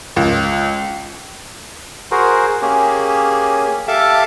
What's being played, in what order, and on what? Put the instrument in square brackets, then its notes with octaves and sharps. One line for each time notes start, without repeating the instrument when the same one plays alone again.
[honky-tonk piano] C#2
[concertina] F#4 G#4 A#4 C5
A#3 C#4 G4 G#4
G4 A4 E5 F5 A5 D6